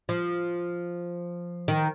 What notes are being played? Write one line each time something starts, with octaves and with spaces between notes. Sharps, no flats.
F3
D#3